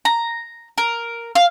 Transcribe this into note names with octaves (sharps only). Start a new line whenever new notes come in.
A#5
A#4
F5